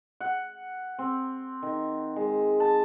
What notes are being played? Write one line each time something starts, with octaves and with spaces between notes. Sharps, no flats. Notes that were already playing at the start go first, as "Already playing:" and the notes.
F#5
C4
D#3
G#3
A5